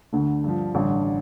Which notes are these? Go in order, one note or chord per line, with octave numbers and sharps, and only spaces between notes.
D2 D3 A3
G2 D3 F3
A1 G2 D3